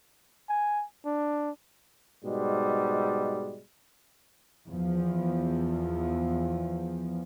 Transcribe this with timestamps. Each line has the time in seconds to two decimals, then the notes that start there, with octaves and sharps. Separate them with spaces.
0.49 G#5
1.05 D4
2.24 G#2 B2 G3 G#3
4.68 E2 F3